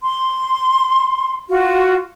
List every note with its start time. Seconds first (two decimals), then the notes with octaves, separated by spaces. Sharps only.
0.02 C6
1.49 F4 F#4